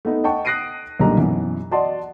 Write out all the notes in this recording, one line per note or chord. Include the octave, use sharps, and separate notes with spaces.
A3 B3 D#4
D#5 F#5 G5 A5 C#6
D#6 F#6 A#6 C7 D7 D#7
B1 A#2 D3 G3 D#5 A#5
F#2 B2 E3
F#4 D5 D#5 A5 C6